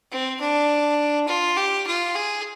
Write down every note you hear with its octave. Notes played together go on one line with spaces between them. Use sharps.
C4
D4
F4
G4
F4
G#4